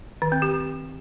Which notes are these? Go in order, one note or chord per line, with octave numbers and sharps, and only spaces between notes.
D#3
C4
G4